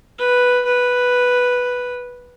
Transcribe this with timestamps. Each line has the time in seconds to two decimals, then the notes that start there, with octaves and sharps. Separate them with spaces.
0.18 B4
0.65 B4